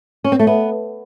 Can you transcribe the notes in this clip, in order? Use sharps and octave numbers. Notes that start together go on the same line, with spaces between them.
C#4
C4
A3
B3